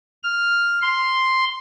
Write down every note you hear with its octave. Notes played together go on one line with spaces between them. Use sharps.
F6
C6